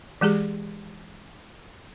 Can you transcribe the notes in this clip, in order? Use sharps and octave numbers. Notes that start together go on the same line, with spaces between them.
E3 G#3 G4 G#4